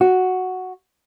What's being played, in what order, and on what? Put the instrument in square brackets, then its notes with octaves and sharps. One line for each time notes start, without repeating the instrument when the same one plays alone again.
[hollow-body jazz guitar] F#4